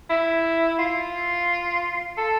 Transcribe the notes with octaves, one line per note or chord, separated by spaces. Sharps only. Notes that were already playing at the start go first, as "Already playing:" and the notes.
E4
F4
A4